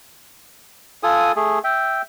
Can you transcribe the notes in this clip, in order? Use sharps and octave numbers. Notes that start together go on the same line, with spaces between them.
F4 A4 G#5 D#6
A3 G#4
E5 G5